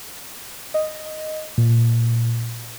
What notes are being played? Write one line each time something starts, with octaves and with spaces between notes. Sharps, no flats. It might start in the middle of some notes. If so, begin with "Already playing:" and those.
D#5
A#2